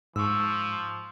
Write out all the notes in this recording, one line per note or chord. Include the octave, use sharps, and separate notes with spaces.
G#2 F3 C#6 E6